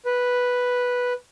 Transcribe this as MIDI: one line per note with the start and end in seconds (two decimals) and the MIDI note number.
0.05 1.13 71